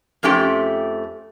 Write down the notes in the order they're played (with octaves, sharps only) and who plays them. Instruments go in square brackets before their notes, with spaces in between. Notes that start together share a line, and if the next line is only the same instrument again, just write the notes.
[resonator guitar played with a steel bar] F2 F3 A3 C#4 G4 G5